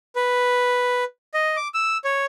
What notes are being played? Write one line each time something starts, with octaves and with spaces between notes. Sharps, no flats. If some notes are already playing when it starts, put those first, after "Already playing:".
B4
D#5
D6
E6
C#5